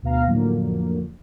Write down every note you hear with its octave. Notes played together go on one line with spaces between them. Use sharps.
D2 B2 B3 F5 A#5
F2 A2 D3 F#3 A#3